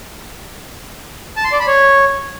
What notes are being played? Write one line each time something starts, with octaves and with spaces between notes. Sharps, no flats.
A5
C6
D5
B5
C#5